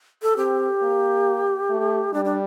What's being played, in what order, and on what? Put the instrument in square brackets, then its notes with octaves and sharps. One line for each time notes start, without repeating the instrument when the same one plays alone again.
[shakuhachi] A4
[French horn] C4 [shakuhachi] G4
[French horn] A#3
A3
[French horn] G3 [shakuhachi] D4
[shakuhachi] D4